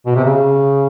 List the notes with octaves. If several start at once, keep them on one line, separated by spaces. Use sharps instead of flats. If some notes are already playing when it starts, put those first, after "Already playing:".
B2
C3
C#3